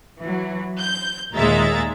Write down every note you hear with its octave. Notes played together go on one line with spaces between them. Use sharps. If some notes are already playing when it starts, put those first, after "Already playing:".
E3 F#3
G6
D#2 A#2 G#3 E5 A#5 A6